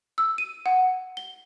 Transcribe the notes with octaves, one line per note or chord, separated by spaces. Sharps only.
E6
D#7
F#5
G7